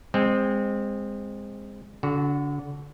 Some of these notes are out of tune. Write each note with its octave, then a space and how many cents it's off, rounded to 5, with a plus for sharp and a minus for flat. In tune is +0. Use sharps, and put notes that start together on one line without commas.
G#3 -20 C4 +0
D3 -30 F#4 +0